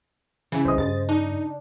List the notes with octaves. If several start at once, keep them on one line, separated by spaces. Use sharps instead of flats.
C#3 E3
C2 C5 D#5
G2 A6
D4 D#4